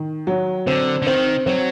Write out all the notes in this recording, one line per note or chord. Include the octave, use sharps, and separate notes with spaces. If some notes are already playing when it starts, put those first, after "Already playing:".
Already playing: D#3
F#3
D3 C4
D3
D#3 C4
F#3 C4